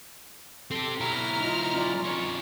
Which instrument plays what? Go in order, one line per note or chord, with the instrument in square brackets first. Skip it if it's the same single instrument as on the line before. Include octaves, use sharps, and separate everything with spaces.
[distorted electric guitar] C4 G4 [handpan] A4
[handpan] B2 [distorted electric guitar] F#3 E4 [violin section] A#5 F6
[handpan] D#4 F4
C#4 F4 D5
[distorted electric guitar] F2 C#5